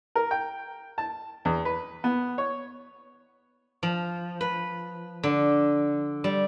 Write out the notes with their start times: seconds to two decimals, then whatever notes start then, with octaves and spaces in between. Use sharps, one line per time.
0.15 A#4
0.31 G5
0.98 A5
1.45 E2
1.65 B4
2.04 B3
2.38 C#5
3.83 F3
4.41 B4
5.23 D3
6.24 G3